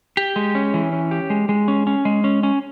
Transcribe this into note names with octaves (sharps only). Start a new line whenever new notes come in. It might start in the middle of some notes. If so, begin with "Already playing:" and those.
G4
G#3
C#4
E3
C#4
G4
G#3
G#3
C#4
C#4
G#3
C#4
C#4